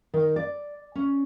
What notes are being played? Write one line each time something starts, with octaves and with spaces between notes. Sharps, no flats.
D#3
D5
C#4